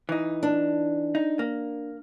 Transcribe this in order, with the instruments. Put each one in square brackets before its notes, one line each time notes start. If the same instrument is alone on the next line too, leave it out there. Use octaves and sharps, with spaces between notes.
[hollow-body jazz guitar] E3 D#4
[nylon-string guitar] D4
[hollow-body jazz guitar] D#4
A#3